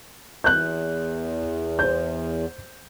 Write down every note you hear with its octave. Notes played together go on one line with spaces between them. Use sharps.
E2 F#6 G6
C5 G6